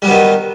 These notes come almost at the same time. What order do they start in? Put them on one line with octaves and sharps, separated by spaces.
G3 F#3 B3 D#3